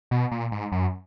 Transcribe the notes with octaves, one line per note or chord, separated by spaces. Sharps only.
B2
A#2
G#2
F#2